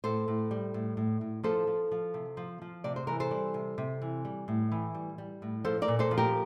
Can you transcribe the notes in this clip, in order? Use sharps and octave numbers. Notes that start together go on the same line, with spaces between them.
A2 A4 C5
A2
G3
A2
A2
A2
F3 A4 C5
F3
F3
C3
F3
F3
C3 D5
C5
E3 A#4
A4 C5
G3
C3
C3
E3
G3
A2
E3
G3
G3
A2
F3 A4 C5
A#4 D5
A#2
A4 C5
F3
G4 A#4